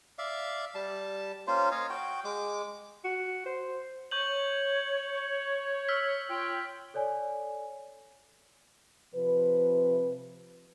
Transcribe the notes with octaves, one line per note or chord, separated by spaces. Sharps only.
D5 E5 F5
G3 A5
A#3 C#4 F4 C5
C#5 D#5 F5
F#4 G5
G#3 D6
F#4
C5
C#5 C#6 G6 F#7
E6 F6 B6
F4 C#5 G5
A4 C#5 D5 G#5
C3 F3 B4